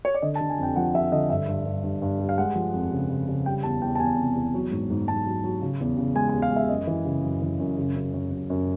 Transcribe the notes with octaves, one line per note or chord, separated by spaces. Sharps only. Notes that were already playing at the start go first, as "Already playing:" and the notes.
C#5
D5
D3 D#5
A5
D3
G#5
F2 G5
F3 F#5
F3 E5
D3 D#5
G2 E5
G2
G2
G2
G2
G3
F5
G#3 F#5
F3
F2
C#3
C#3
C#3
G3 G5
E2 A5
E2 G5
A5
E2 G#5
C3
E2
F#3
G#2
G#2
G#2 A5
F#3
F#3
C#3
E2
C#3
G#3 G#5
G#5
E2
F5
G#3
E5
F#2 D#5
E3
C#3
F#2
E3
F#2
C#3
F#2
F#2
F#2
F#2